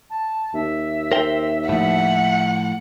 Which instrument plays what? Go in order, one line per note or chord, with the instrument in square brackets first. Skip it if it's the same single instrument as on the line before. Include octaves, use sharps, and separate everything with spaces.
[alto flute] A5
[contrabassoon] D#2 [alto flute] E5
[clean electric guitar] A#4 C5 G5
[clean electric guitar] A2 F3 [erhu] F#5